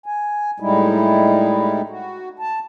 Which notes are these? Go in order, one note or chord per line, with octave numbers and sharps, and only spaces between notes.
G#5
A2 G3 G#3 D#4 E4
F#4
A5